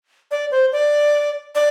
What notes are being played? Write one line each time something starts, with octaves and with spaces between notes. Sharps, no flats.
D5
C5
D5
D5